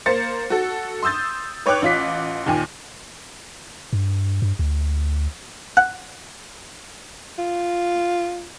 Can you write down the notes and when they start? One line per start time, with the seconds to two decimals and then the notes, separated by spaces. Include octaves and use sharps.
0.06 A#3 C5 A6 C#7
0.50 F#4 A4
1.03 C6 D#6 E6 G6 A6
1.66 B4 C#5 G5 D6 F#6
1.82 A1 F4 B6
2.46 D#2 A#2 D#3 G#5
3.93 G2
4.42 G2
4.59 D2
5.77 F#5
7.39 F4